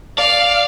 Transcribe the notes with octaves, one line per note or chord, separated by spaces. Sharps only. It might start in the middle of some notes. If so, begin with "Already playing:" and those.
D5 F5